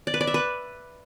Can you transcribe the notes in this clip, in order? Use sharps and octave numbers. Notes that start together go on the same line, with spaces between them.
D5
B4
D5
E5
B4